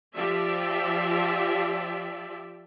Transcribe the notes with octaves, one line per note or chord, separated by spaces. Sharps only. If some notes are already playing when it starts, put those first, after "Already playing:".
F3 G4 D5 E5